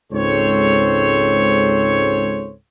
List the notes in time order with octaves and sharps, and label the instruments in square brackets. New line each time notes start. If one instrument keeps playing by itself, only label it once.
[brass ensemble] C#2 G#2 C4 A4 C5 C#5